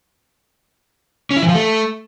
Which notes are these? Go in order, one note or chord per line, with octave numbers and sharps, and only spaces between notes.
C#4
E4
E3
F3
A3